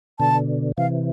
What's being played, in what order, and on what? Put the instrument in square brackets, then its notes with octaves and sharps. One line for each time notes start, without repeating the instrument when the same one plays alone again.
[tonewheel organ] B2 D3 [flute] A5
[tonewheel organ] C3 E3 [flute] F5